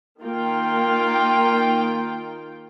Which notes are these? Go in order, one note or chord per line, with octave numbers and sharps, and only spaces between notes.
D#3 A#3 F4 G5